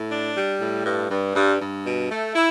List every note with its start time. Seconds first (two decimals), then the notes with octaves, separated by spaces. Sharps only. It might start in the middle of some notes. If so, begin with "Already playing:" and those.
Already playing: A2
0.11 D4
0.36 G3
0.60 A2
0.86 G2
1.11 G2
1.35 G2
1.60 G2
1.85 B2
2.11 A3
2.35 E4